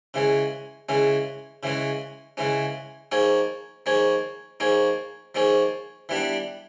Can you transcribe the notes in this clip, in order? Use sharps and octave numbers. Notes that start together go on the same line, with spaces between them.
C#3 E3 G#3 C#4
C#3 E3 G#3 C#4
C#3 E3 G#3 C#4
C#3 E3 G#3 C#4
F3 A#3 D#4 G#4 C#5
F3 A#3 D#4 G#4 C#5
F3 A#3 D#4 G#4 C#5
F3 A#3 D#4 G#4 C#5
E3 G3 B3 D4